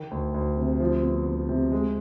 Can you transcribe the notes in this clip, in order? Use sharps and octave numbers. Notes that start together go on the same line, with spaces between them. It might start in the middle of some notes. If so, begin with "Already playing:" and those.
Already playing: D#3
D2
D2
C3
F3
B3
D2
C3
G#3